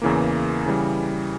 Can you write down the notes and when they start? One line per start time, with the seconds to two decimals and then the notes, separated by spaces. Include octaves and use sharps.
0.02 E2 C#3 E3 A#3
0.66 C#3 E3 G3